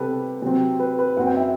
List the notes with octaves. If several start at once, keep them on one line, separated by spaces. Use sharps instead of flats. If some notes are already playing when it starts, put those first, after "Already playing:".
Already playing: C3 G3 B3 G4 A4 B4
C3 F#3 C4
B4
B4
F#2 F#3 C4 F#5
G5
E5